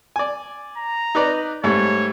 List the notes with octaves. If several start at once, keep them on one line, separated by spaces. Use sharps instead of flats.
D5 G#5
A#5
D#4 B4 D5
G#2 G3 A3 C#5